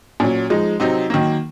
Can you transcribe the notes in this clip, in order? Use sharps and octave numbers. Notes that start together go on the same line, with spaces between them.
A#2 F#3 C#4
F3 G#3 D#4
C3 F#3 C4 D#4
D#3 F#3 A#3